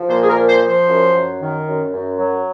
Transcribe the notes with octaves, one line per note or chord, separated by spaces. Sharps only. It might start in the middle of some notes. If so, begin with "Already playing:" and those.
Already playing: F3
A#2 C5
G#4
A#4
F3
C5
F3
C5
F#2
F#2
D#3
F#2
F#2
F#3